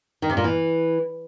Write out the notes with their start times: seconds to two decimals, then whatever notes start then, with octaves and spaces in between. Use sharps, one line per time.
0.22 D#3
0.30 C3
0.37 A#2
0.44 E3